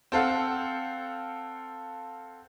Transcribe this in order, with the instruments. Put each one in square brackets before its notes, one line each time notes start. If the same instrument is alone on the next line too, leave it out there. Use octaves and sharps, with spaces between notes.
[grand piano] C4 A4 F5 F#5